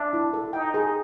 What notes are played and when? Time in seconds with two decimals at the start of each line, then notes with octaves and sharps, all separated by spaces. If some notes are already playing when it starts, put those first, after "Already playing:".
Already playing: D4 E5
0.13 E4
0.33 A4
0.53 D#4 G5
0.74 G#4